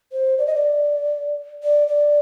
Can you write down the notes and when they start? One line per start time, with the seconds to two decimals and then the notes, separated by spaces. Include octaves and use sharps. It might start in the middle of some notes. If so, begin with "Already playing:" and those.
0.12 C5
0.38 D5
0.47 D#5
0.55 D5
1.63 D5
1.88 D5